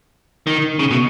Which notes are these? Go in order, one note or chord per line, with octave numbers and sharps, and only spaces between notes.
D#3
C#3
B2